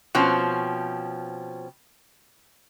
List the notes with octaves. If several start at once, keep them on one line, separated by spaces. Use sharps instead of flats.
B2 F3 C4 C#4